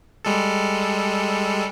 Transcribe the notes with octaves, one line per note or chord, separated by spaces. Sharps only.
G3 G#3 A4